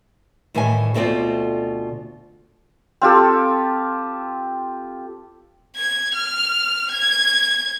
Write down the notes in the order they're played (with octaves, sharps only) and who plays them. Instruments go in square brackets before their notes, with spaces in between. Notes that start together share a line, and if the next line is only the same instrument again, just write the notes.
[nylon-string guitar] A2 D#3 E3 G3 E5 G#5
D2 B2 A3 C4 F4 D5
[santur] C4 F4 G4 A4
[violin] G#6
F6
G#6